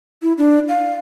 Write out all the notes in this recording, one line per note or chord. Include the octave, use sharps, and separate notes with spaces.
E4
D4
F5